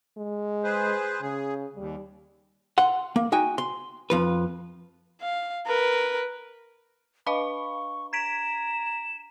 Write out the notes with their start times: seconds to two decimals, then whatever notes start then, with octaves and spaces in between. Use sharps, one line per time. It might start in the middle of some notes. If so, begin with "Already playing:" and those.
0.18 G#3
0.64 G#4 B4 C5
1.21 C#3 G#4
1.76 D#2 G3
2.78 F#5 C6
3.16 A#3
3.32 D#4 F#4 G5 G#5
3.58 C6
4.10 F2 F3 B4
5.22 F5
5.67 A#4 B4
7.27 D4 B4 D#5 F5 B5 C#6
8.13 A#5 G#6 B6 D7 E7